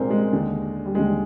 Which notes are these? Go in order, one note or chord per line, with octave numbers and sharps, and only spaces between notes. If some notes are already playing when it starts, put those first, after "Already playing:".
Already playing: C2 A#2 G#3 A#3 C4 D4
G#3
D#2 D3
G3
D#2 D3 G#3